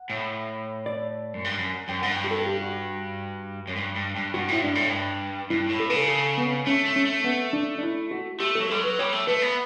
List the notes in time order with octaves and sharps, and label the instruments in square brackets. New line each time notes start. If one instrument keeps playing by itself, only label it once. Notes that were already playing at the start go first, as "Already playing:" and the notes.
Already playing: [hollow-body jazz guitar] F#5
[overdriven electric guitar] A2
[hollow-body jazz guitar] D5
[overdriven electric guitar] F#2
G2
F#2
[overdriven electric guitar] F#2 [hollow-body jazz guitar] G5
[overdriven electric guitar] G2 [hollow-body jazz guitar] F#5
[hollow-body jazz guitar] G5
G4
A4
G4
F#4
[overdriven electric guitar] F#2
G2
G2
G2
[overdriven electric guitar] G2 [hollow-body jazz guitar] F#4
[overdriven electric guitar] A2 [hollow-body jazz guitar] E4
[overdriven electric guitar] G2 [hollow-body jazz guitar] D4
[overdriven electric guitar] A2
G2
[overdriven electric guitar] G2 [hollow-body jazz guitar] E4
[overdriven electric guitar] A2
[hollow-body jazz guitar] A4
[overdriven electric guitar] C#3 [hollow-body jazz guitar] B4
[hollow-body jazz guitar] A4
A4
B3
[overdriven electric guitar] A3 [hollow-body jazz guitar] C#4
[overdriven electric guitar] A3
[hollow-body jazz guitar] C#4
[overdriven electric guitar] A3
[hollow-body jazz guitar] B3
D4
D4
E4
F#4
[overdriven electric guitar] A3 [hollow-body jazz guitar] G4
[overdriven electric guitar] F#3 [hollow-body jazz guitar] A4
[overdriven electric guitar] G3 [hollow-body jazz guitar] A4
[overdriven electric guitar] F#3
[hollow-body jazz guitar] B4
[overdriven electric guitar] G3 [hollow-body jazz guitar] C#5
[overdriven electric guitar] A3
[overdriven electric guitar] A3 [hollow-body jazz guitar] B4
[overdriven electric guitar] B3